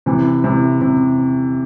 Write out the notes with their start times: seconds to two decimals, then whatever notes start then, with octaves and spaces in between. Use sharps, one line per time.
0.06 C3 E3
0.44 C3 E3
0.82 C3